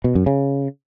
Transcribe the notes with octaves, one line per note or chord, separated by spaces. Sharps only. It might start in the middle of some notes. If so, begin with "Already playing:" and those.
B2
F#2
C#3